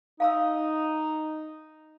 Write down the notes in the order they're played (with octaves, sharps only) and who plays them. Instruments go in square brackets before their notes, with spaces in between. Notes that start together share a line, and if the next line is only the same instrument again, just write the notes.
[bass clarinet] D#4 [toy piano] F5 A#5 E6